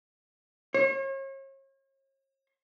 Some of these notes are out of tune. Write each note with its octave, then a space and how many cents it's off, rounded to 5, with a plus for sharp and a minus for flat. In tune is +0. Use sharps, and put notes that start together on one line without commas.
C#5 -40